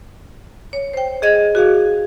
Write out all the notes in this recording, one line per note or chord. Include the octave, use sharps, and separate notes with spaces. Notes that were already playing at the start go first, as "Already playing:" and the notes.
C#5
C5 G5
G#4 D#5 G#6
F#4 G#4 F5